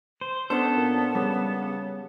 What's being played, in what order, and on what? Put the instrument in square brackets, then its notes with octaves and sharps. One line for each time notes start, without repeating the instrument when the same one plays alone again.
[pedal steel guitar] C5
[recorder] B3 [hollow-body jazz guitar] C#4 D4 C5 [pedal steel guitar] A4
[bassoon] A#2
[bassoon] C#3 [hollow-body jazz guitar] G3